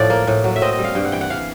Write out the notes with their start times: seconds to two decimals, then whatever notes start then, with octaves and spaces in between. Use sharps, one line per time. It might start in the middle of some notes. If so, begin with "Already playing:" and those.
Already playing: A2 F3 D5
0.10 A#3
0.27 A2
0.44 F#3
0.56 E5
0.62 C4 D#5
0.73 D#5
0.79 G3
0.84 F5
0.95 G2 G5
1.05 F#5
1.12 E3 G5
1.21 F#5
1.30 E3 F5